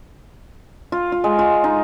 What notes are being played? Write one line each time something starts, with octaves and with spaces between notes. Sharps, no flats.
F4
F4
G#3
F4
D#4